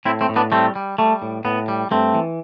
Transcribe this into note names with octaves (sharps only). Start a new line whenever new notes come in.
A2 C4 E4
A3 C4
A2
B3 D4
G3 A3 C4
G3
G3 A3
A2
A2 B3
G3
G2 A3 C4
E3